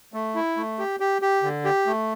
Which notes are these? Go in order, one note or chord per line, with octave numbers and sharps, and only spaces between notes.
A3
E4
A3
G4
G4
G4
D3
G4
A3